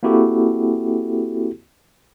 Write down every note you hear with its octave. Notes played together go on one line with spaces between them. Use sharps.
A#3 C4 E4 F#4 G4 A4